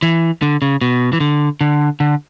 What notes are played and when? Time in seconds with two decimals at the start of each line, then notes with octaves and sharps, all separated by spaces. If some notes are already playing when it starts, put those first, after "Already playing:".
0.03 E3
0.42 D3
0.62 C#3
0.81 B2
1.13 E3
1.20 D3
1.61 D3
2.00 D3